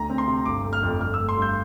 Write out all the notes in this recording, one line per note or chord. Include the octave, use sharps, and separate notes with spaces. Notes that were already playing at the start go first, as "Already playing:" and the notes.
Already playing: D2 A#5
C4
C6
C3
G1 D6
A3
F6
F2
G1 F6
E6
A3
C6
G2 G6